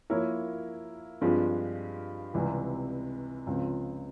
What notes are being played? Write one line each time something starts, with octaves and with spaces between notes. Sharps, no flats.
F3 A#3 E4 A#4 C#5
G2 F3 G#3 C4 F4
C#2 C3 E3 G3 C4
C#2 C#3 F3 C4